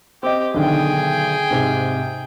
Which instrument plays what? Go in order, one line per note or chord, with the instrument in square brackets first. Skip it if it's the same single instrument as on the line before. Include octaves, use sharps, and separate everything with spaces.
[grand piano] C4 D#5 [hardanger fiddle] G4
[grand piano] B1 D3 D#3 [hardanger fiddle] G#4 G5
[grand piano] G#2 C3 G7